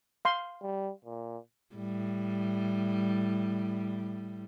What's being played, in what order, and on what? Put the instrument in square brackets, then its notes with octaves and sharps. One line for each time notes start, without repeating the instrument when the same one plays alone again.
[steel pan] F5 C6
[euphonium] G3
A#2
[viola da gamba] A2 G3